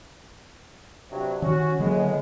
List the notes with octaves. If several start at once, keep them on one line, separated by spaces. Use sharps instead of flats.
G2 C3 F#3
D#3 C#4 F#4
A2 D3 F#3 G#3 A#3 B3